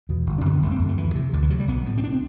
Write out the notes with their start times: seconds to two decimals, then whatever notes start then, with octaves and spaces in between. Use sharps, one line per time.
0.09 E2 B2
0.26 G1
0.38 D4
0.45 F#2 D3 C4
0.54 B3
0.62 G1 A3
0.71 C4
0.79 F#2 D3
0.89 A3
0.97 D2 E3
1.15 C3
1.33 D2 D3
1.42 E3
1.50 C3 F#3
1.60 G3
1.68 B1 B3
1.86 A2
1.98 C4
2.04 D4
2.13 C4